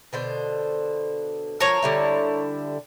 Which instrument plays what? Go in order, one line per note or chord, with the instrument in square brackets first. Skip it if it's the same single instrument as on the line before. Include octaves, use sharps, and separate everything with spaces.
[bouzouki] B2 D3 C5
[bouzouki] F3 F5 A5 [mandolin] A#4 C#5
[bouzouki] D3 G3 E4